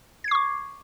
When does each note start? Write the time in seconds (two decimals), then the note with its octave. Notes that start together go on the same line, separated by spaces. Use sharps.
0.24 G#6
0.28 C7
0.31 C#6
0.35 D6